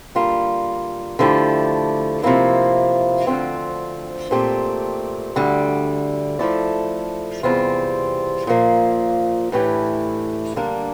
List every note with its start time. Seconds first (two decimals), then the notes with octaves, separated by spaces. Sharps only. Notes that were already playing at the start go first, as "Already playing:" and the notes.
0.15 D3 G3 A#3 F4
1.19 D3 F3 A3 E4 G4
2.23 C3 F3 A#3 E4
3.27 D2 D3 F3 C4
4.31 A#2 A3 C4 G4
5.36 D2 D3 G3
6.39 F3 A3 E4 A4 D5
7.43 E2 C3 G3 C4 F4
8.47 A#2 F3 A#3
9.52 A2 E3 A3 D4 G4
10.56 D3 G3 A#3 D4